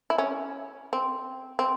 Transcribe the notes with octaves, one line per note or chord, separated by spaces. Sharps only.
E4
C#4
C4
C4